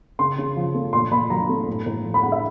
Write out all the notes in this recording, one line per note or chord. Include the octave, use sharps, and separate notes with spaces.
C#3 C6
C#3
F3
A3
A#2 C6
A#2 B5
F#3 A#5
A3
A2
A2
F3
B5
G#3 F#5
E5